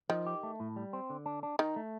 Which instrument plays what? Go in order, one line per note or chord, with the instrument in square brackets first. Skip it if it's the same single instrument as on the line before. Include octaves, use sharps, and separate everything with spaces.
[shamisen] D#3 [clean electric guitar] F3
[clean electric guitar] G4
A3
A2
G3
C4
D3
D4
D4
[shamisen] D#3 [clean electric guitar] D#4
[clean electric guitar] A3